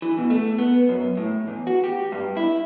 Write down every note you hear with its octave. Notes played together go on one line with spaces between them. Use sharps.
E3
B2
A3
B3
F#2
A2
E2
F#4
G4
G2
E4